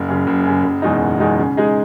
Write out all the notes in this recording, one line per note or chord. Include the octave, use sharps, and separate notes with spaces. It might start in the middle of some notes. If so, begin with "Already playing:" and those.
Already playing: F#1
F#2 C#3
F#1
F#2
C#3
F#1
E2 B2 G#3 D#4
F#1
E2 B2 G#3 D#4
C#3
G#3 D#4 G#4 D#5